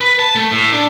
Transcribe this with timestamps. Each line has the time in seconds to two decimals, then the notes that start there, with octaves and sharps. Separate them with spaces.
0.01 B4
0.19 A5
0.36 A3
0.51 A2
0.73 D4